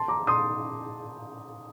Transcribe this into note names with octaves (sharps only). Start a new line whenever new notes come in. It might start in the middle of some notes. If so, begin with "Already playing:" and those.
Already playing: A5 C6
A#5 D6
C6 D#6